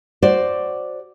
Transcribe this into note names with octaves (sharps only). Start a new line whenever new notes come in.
F#4 C5 D5